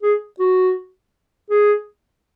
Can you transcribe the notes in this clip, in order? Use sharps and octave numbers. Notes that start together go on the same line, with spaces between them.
G#4
F#4
G#4